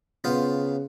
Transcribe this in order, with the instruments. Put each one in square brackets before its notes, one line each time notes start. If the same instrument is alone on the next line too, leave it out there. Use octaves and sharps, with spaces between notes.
[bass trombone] C#3 [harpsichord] B3 F4 C5